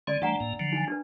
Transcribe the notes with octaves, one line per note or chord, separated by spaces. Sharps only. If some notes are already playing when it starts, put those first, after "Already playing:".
D3 G#3 C#4 D5 C6
E3 G3 A3 D4 F#5 A#5
A2 A#3
D3 F3 F#3
D#4 G#5
D4 B4